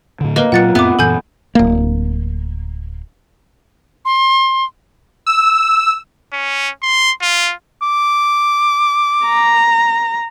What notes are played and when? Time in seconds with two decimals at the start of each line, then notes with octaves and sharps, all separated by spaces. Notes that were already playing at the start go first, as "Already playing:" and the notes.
0.21 A2 D3
0.36 A#3 A#4 B4 D#5
0.52 A#2 F#3 F4 D#5 F#5 F#6 A6 C#7
0.75 F2 A2 B3 C4 E5 D6
0.99 F#2 A#2 E3 A4 G#5 G6
1.55 D1 A#3
4.05 C6
5.27 E6
6.33 C#4
6.83 C6
7.22 F4
7.82 D6
9.27 A#5